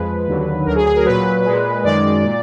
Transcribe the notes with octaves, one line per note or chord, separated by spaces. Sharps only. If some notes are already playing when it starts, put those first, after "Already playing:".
Already playing: F2 F3 G#3 B4
D#2 D3 F#3
D2 D3 F#3 A#4
G#4
G#4
A#4
A#2 F#3 B4
A#2 G#3
F#2 D#3 G#3 D5
A#2